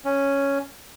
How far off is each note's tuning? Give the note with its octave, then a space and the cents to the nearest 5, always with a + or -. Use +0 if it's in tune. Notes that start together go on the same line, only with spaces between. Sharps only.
C#4 +0